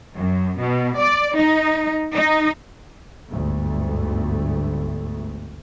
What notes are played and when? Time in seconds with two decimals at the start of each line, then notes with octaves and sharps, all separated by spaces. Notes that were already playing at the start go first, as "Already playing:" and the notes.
0.15 F#2
0.59 B2
0.98 D5
1.36 D#4
2.14 D#4
3.29 G1 D2 G#2 A3